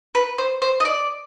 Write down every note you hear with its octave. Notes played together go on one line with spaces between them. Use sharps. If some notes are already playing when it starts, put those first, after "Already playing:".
B4
C5
C5
D#5
D5